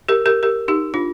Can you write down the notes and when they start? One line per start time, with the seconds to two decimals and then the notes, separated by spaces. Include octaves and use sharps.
0.09 G4 A#4
0.26 G4 A#4
0.43 G4 A#4
0.68 D#4 G4
0.94 D4 F4